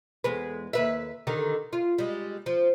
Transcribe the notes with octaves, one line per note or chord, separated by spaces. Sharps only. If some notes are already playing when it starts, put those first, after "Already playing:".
E2 G#3 B4
D#2 B4 E5
D3 D#3 G4
F4
G3 G#3
F3